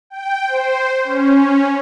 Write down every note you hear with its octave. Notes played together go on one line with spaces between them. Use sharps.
G5
C5
C#4